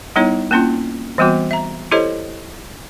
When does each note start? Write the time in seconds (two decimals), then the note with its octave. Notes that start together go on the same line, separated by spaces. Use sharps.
0.16 G3 B3 D#4 E4 C#5
0.51 A#3 C4 C#4 E4 F4
1.18 E3 G3 B3 C4 F#4
1.51 E5 A#5
1.91 E4 G4 A4 C5 C#5 D#5